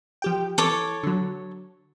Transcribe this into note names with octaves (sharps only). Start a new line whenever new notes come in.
F3 G4 G5
E3 A4 C#5 D6
D3 F#3